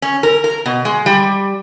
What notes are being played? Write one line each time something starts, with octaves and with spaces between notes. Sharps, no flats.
C#4
A#4
A#4
B2
G#3
G3